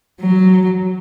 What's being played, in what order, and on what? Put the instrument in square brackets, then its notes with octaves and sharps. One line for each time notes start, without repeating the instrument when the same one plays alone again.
[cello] F#3